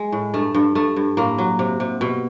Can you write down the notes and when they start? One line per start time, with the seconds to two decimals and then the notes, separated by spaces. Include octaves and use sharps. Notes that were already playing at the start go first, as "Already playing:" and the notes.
Already playing: G#3
0.12 A2
0.34 G2 A3
0.54 G2
0.75 G2 A3
0.96 G2
1.17 A2 A#3
1.38 F#3
1.59 C3
1.80 C3
2.01 B2